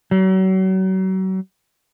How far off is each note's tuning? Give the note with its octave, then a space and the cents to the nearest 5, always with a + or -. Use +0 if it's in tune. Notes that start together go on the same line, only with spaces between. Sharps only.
F#3 +35